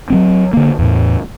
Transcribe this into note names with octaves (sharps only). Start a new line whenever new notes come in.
F#3 G3 C4
D3 A#3
E2 A2